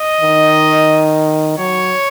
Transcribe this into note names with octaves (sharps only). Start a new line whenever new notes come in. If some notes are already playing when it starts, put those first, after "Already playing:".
Already playing: D#5
D#3
F#3 C#5